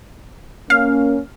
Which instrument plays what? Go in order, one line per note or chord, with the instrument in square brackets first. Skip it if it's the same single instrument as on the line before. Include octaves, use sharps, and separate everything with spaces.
[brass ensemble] A#3 C#4 [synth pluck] F5